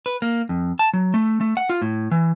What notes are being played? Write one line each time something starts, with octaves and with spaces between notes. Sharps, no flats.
B4
A#3
F2
A5
F#3
A3
A3
F#5
F4
A2
E3